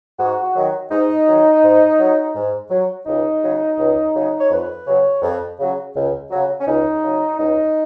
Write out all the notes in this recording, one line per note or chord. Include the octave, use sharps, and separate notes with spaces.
G#2 F#4
F#4
D#3 F#3
G#2 D#4
D#3 F#3
G#2
F#3
G#2
F#3
C#2 D#4
C#3 F#3
C#2
C#3 F#3
C#5
F2 B4
C#3 F#3 C#5
F2
C#3 F#3
C#2
C#3 F#3
C#4
C#2 D#4
C#3 F#3
C#2 D#4